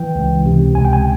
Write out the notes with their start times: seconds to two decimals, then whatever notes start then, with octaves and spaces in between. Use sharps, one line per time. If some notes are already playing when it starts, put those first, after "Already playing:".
Already playing: E3 G5
0.15 C#2
0.46 C3
0.75 C#2 G#5
0.85 G5
0.93 G#5